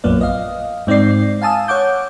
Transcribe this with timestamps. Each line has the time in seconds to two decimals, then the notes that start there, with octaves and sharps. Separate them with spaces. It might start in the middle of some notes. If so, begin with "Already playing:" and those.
0.04 A#1 F#2 A#3 B3 D5
0.21 D#5 F5
0.87 G#2 C4 D#4 D5 C7
1.42 F5 G#5 A5 D#6 E6
1.68 C#5 F#5 D6 G6